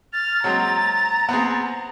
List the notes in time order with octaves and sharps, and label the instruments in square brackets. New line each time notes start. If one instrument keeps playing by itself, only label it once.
[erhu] F6 [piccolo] A6
[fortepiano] F#3 G#3 C4 [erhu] A#5
[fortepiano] B3 C4 G#4